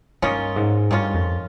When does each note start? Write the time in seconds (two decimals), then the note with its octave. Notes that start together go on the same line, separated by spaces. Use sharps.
0.22 G2 D#3 A#3 C#4 F4
0.56 G#2
0.90 G2 D#3 A#3 C#4 F4
1.14 F2